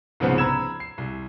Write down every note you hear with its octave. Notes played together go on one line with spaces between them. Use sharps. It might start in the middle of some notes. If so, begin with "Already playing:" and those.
C2 G#2 C#3 F3 B3 C4
A#5 B5 E6 G#6 E7
C7
C2